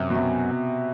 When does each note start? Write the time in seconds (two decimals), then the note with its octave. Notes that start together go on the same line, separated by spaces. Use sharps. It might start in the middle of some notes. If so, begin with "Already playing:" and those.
Already playing: F#2 C3
0.10 B2
0.15 C3